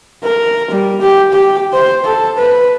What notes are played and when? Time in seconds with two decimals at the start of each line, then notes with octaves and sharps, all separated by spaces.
0.24 A#4
0.71 G3
1.01 G4
1.33 G4
1.73 C5
2.04 A4
2.37 B4